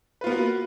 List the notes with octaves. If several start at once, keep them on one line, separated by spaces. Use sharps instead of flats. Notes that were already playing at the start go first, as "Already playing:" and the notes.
A#3 B3 F4 F#4 B4